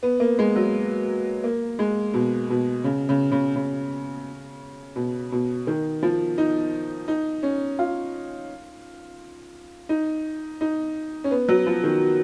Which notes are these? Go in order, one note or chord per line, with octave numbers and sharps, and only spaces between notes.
B3
A#3
G#3
F#3
A#3
G#3
B2
B2
C#3
C#3
C#3
C#3
B2
B2
D#3
F3
D#4
D#4
C#4
F4
D#4
D#4
C#4
B3
F#3
F3
D#3